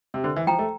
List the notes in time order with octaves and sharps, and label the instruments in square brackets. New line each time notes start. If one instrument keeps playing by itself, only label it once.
[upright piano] C3
[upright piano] D3 [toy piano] C5
[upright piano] E3
[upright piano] F3 [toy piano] G5 A#5
[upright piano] A3